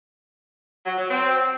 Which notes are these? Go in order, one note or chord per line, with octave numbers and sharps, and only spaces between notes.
F#3
F#3
C4